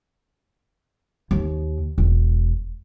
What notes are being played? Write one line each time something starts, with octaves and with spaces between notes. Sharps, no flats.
D#2
E1